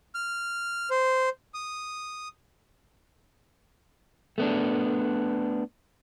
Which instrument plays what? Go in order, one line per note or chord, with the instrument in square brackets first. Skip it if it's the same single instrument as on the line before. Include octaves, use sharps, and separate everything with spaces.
[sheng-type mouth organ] F6
C5
D#6
[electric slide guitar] A3 B3 D4